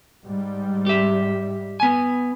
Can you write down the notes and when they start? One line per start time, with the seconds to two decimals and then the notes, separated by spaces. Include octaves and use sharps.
0.24 G#2 G3
0.87 G4 E5
1.80 B3 G#5